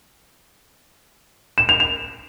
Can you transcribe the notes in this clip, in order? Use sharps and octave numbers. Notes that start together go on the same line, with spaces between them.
E7
F7
F7